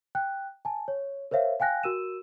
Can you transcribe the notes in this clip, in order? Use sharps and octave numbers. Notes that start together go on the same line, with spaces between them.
G5 F#6
G#5 A5
C#5
A#4 C5 C#5 E5 F5
F5 G5 G#5 F#6 A#6
F#4 A#4 E6 D#7 E7